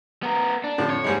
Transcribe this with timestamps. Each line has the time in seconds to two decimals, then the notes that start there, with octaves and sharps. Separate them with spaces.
0.23 B3 A#4
0.64 D4
0.78 F2 A2 D3
0.90 C#5
1.04 G#2 G3 G#3